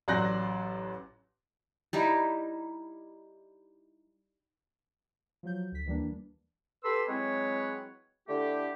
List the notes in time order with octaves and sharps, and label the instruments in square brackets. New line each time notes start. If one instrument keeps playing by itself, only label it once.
[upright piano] A1 F#3 D5 C6 F#6 A#6
[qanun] G3 D#4 E4
[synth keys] F3 F#3 G6
D2 B6
D#2 E3 G3 A#3 D4
[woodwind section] G4 A4 B4 C6 E6
F#3 G#3 C4 E4 B4 C#5
D3 A3 E4 G4